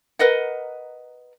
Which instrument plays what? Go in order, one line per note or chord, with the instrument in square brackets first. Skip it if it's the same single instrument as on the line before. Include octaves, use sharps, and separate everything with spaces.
[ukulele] A#4 B4 D#5 F#5